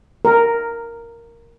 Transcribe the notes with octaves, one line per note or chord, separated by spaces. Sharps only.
A#4